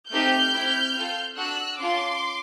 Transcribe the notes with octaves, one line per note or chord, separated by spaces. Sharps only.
A3 C4 D#4 G4 F6 G6
C4 E4 G4
C4 F4 A4
D4 F#4 A4 E6 F#6
C#4 F4 A4 C6 D6